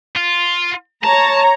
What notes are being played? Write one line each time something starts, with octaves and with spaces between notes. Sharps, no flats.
F4
C#5 A5 A#5